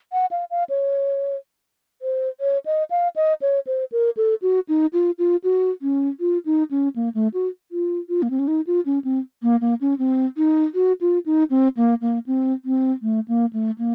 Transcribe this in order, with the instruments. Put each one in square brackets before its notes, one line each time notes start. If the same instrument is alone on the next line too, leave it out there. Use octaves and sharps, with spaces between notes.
[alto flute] F#5
F5
F5
C#5
C5
C#5
D#5
F5
D#5
C#5
C5
A#4
A4
F#4
D#4
F4
F4
F#4
C#4
F4
D#4
C#4
A#3
A3
F#4
F4
F4
A#3
C4
C#4
D#4
F4
C#4
C4
A#3
A#3
C#4
C4
D#4
F#4
F4
D#4
C4
A#3
A#3
C4
C4
A3
A#3
A3
A#3